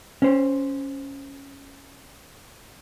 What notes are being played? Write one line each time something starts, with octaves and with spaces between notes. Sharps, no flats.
C#4 C5